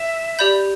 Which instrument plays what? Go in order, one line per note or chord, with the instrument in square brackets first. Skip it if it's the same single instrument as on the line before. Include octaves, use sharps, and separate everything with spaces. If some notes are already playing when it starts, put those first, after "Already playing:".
Already playing: [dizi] E5
[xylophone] G4 D5 B5 G6